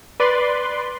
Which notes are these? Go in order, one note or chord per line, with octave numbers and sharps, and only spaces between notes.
B4 D5 C6